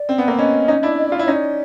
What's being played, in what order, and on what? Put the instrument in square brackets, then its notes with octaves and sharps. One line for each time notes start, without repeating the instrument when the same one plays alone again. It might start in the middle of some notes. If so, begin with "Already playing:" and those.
Already playing: [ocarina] D5
[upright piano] C4
B3
A#3 C4
[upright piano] B3 C#4 [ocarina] D#5
[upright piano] C#4 D#4
D4 E4
[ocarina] D#5
D5
[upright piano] F4
[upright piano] E4 [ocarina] D5
[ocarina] C#5
[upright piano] C#4 D#4
[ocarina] D5